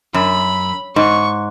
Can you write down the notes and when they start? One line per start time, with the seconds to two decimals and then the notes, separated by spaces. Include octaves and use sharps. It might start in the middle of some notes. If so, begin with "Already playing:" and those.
0.14 F#2 B5
0.96 G#2 C#6